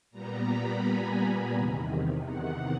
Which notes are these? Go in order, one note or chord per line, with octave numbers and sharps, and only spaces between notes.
A#2 G3 B3 A#5
B5
G#5
E2 C3 D#3
F#5